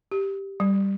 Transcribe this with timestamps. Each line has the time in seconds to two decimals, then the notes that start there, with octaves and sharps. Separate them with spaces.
0.12 G4
0.60 G3